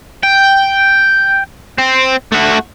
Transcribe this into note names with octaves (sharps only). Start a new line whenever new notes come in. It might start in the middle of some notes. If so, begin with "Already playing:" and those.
G5
C4
A3 F#4